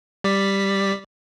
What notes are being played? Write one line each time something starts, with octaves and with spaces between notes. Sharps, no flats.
G3 D5 B6